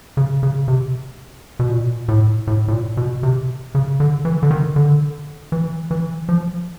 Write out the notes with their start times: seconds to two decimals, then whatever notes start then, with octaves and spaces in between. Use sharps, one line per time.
0.17 C#3
0.43 C#3
0.68 C3
1.59 B2
1.70 A#2
2.08 A2
2.47 A2
2.68 A2
2.73 A#2
2.97 B2
3.23 C3
3.75 C#3
4.00 D3
4.25 E3
4.43 D3
4.51 D#3
4.76 D3
5.52 E3
5.91 E3
6.29 F3